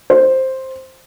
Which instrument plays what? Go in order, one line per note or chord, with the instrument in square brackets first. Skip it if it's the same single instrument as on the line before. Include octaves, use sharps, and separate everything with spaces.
[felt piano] C5